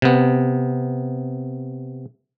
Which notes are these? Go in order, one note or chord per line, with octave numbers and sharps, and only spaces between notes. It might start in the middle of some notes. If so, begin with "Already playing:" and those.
C3 B3